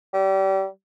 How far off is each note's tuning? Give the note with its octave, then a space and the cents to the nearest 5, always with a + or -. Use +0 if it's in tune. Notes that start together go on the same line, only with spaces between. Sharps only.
G3 -30